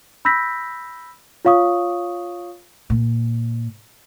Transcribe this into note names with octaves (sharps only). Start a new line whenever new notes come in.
B5 E6 G6 A#6 B6
F4 C#5 F5 C#6 D#6
A#2